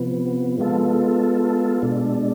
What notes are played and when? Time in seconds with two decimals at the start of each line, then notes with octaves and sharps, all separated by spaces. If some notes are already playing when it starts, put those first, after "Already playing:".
Already playing: C3 F3 B3
0.58 G#3 B3 F4 A4
1.82 B2 G#3 D4